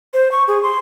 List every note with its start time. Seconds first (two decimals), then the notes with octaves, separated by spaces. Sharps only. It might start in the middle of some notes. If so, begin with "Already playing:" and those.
0.14 C5
0.32 C#6
0.48 G#4
0.63 C6